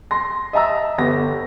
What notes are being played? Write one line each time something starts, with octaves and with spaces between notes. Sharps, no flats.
C6 A#6
D#5 E5 A5 A#5 E6
G1 B3 G4 A#6